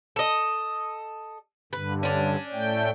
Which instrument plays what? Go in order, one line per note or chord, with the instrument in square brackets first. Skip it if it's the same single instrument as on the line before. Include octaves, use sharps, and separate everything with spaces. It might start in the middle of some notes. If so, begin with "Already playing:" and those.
[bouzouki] A4 D#5
[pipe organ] G2 D3 [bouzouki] B4
[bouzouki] C#4 D4
[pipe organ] A2 A3 G5